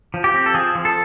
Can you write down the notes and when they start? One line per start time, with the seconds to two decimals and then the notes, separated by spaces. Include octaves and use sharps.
0.14 F3
0.24 G4
0.34 C4
0.46 A4
0.54 F3 G#4
0.75 F3
0.85 A4